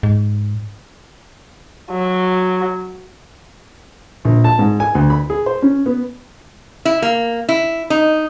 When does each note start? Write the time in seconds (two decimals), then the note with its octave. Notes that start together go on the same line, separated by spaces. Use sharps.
0.03 G#2
1.91 F#3
4.25 A#1
4.44 A5
4.59 G#2
4.80 G#5
4.95 D2
5.10 B5
5.30 G#4
5.46 C5
5.62 C#4
5.86 B3
6.85 E4
7.02 A#3
7.49 E4
7.90 D#4